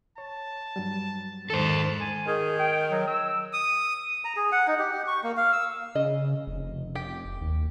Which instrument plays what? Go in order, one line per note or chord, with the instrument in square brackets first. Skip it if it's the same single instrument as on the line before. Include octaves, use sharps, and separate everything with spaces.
[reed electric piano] C#5 [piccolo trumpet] A5
[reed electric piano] G2 F#3 G3
[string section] G#2 D3 D#3 [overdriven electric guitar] A4 C5 [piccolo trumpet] A5
[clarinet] G#5
[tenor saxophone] D#3 [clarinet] G#4
[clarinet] G5
F#3
E6
[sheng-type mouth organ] D#6
[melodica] A#5
G#4
F#5
D#4
G4
G4
C#6
A#3
F5
E6
[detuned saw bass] C#3 [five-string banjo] D#5
[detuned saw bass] F1
[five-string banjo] G4
[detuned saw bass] D#2